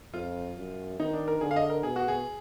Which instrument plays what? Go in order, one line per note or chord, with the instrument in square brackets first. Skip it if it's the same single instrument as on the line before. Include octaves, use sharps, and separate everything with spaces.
[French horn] F2 [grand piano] F4
[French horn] F#2
[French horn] D#3 [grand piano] D#4
[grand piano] D4
A#4
[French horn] D3 [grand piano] G#4
[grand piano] F5
D#5
A#4
[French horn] B2 [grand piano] G#4
[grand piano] F#4
G#4